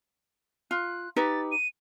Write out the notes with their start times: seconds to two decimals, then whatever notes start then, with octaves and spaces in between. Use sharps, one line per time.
0.71 F4 F#6
1.16 D#4 G4 B4 A6
1.52 D#7